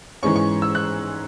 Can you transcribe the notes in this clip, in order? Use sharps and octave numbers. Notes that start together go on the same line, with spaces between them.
G#2 E3 G#3 C#4 C#6
C#6
E6
F#6